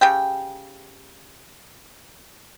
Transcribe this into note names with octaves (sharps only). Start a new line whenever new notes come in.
C#3 G4 G5